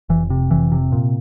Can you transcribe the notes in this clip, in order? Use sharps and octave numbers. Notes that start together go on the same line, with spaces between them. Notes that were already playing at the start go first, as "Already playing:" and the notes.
F1 E3
C3
F1 E3
C3
A#2